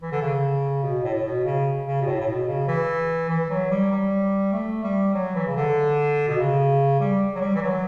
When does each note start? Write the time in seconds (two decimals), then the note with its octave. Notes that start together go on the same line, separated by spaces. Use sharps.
0.02 E3
0.12 D3
0.21 C#3
0.83 B2
1.04 A2
1.14 A2
1.24 B2
1.45 C#3
1.86 C#3
2.01 B2
2.06 A2
2.19 A2
2.27 B2
2.48 C#3
2.68 E3
3.29 E3
3.50 F#3
3.71 G3
3.91 G3
4.53 A3
4.83 G3
5.14 F#3
5.35 E3
5.47 C#3
5.56 D3
6.28 B2
6.38 C#3
7.00 G3
7.35 F#3
7.41 G3
7.55 E3
7.62 F#3